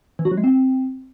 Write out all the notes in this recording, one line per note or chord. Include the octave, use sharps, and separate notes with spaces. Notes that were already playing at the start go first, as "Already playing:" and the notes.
E3
F#4
F#3
G#3
C4